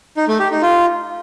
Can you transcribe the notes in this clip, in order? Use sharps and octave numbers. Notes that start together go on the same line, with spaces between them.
D#4
A3
G4
D#4
F4